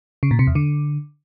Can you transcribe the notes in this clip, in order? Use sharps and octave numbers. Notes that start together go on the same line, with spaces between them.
C#3
A#2
C3
E2
D3